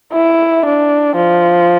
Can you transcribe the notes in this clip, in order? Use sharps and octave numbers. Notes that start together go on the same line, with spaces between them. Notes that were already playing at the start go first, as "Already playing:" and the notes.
E4
D4
F3